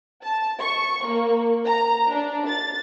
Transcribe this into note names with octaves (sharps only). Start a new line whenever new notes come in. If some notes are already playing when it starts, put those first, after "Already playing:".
A5
C#6
A#3
A#5
D4
A6